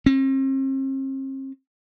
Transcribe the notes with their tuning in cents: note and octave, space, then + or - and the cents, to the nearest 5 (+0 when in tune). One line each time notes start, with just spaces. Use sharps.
C4 +45